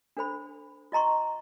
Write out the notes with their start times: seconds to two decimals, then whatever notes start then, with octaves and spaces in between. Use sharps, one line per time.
0.17 D4 A4 C5 B5
0.92 F4 D#5 A#5 C6 C#6